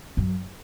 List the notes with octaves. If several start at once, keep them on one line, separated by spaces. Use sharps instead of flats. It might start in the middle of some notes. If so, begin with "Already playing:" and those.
F#2